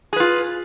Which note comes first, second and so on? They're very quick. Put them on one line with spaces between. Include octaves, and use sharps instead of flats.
G#4 B4 F4